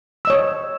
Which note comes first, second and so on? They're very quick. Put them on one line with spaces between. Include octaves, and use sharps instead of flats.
E6 D#5 C#5